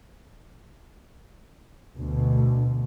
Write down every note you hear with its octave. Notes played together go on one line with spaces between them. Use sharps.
D2 B2